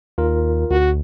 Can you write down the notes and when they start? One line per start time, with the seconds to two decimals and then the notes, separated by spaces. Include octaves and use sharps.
0.18 D#2 F4 A#4
0.71 D2 F#4